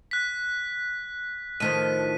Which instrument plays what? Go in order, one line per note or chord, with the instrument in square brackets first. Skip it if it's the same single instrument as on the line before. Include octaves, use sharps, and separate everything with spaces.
[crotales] F#6 B6
[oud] A2 D#3 F3 [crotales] B6 D#7